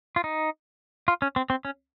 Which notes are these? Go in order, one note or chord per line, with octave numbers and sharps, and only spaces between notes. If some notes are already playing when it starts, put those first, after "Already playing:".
F4
D#4
F4
C#4
C4
C4
C#4